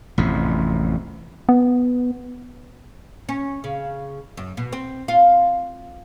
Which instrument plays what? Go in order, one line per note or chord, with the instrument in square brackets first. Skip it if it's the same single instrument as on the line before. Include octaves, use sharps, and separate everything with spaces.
[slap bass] A1 F2 C3
[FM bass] B3
[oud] C#4
C#3
F#2
B2
C4
F4